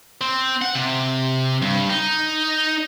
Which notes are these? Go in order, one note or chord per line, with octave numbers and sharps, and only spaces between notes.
C4
F#5
C3
G2
D#4